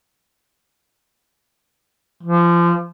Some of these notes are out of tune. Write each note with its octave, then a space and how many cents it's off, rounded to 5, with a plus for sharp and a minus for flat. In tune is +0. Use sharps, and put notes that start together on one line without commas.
F3 -25